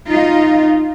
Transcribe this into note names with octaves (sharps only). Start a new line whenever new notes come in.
D#4 F4